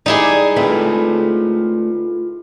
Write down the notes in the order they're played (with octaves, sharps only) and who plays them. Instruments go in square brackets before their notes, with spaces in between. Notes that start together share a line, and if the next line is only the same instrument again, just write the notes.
[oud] G3 G4 [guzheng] D#4 E4 G#4
[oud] D2 A3 C4 [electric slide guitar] F4 B4